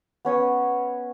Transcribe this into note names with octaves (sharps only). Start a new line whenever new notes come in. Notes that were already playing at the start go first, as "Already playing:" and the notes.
B3 C#4 C#5 D#6